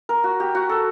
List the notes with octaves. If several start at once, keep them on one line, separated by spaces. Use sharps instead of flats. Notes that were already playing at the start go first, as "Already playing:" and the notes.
A#4
F#4
G4
F#4
A4